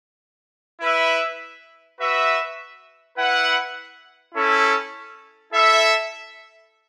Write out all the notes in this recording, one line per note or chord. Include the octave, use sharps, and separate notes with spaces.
E4 B4 E5
F#4 B4 E5
E4 B4 F#5
C#4 E4 A4
E4 A4 E5